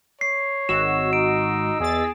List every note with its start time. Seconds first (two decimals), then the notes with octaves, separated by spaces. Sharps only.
0.21 C#5 C7
0.69 G#1 F#4 D#5 E6 E7
1.13 D#4 D7
1.80 E2 G#4 A6